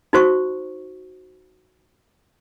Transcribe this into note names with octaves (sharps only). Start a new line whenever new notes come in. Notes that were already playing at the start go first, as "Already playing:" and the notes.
D#4 F#4 C5 C#6